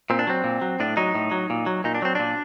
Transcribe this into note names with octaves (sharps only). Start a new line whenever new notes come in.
A#2 C4
D4
F#3 C4
A#2
F#3
A2 D4
F#3 D#4
A2
F#3
A#2
F#3
A#2 D#4
D4
F#3 C4
A#2 D4